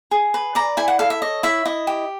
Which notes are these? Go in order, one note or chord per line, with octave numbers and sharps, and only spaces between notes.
G#4
B4
D5 A#5
E4 G#5
F#5
A4 F5
E5
C#5 D#5
E4 E5
E4 D#5
G4